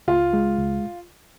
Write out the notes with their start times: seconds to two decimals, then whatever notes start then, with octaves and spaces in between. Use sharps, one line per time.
0.08 C#2 F4
0.33 G#3
0.58 C#2